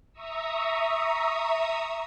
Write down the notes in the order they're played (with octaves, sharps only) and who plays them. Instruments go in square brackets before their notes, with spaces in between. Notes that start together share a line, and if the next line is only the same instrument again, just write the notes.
[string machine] E5 A#5 C#6 D#6 E6